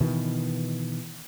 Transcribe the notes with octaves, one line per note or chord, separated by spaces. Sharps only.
B2 D#3 E3